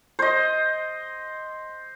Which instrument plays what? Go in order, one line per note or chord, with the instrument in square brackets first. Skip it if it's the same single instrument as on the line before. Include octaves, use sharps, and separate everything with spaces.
[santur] C5 D#5